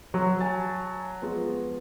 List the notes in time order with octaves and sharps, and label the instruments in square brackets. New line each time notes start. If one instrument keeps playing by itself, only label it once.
[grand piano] F#3
[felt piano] G#5 A5 A6
F3 G#3 B3